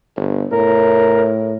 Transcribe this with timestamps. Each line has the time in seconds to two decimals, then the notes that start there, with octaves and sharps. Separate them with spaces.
0.16 G1
0.52 A2 A#4